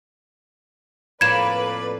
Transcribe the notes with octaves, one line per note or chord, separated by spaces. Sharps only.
F2 A2 A#3 B4 D5 B5 G#6 E7